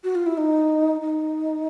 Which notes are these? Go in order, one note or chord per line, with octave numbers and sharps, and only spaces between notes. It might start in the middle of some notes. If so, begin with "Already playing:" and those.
F#4
F4
E4
D#4
D#4